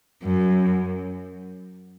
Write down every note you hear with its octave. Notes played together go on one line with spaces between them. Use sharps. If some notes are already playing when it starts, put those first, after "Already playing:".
F#2